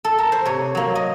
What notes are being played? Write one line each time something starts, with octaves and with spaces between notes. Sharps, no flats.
A4
A#4
C5
C3 C#5
F#3 A#3
D#5